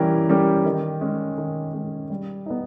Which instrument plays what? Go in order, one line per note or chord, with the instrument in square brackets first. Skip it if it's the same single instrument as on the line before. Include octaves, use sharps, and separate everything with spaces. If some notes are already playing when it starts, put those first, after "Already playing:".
Already playing: [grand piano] E3 G3 C#4 G4 A#4
G3 C#4 G4 A#4
D#3
G#3 C#4
D#3
G#3 C#4
G3
B3 D#4